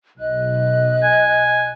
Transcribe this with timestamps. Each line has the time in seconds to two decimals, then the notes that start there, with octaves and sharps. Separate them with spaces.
0.18 B1 D#5 F#6
1.03 G#5